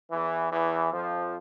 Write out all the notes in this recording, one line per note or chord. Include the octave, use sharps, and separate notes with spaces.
E2 E3
E2 E3
F2 F3